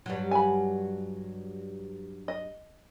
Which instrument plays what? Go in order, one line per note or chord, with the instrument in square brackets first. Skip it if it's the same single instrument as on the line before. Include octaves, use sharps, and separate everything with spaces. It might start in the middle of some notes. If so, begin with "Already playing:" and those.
[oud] G2 F#3
[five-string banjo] G#5 B5
D#5